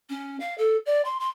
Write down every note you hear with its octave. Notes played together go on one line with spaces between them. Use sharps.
C#4
F5
A4
D5
C6
C6